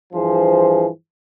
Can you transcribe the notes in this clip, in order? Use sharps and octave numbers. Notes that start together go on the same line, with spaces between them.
G2 E3 F3 G#4 C5